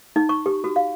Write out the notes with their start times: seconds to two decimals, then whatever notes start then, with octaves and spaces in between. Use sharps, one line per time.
0.16 D#4
0.29 C#6
0.46 G4
0.64 F#4
0.76 F5